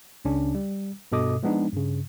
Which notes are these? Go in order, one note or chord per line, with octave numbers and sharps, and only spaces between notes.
C#2 C#3 C#4 D4
G3
G2 B2 A4 D#5 D6 D#6
F3 G#3 B3 D4 D#4
G2 C#3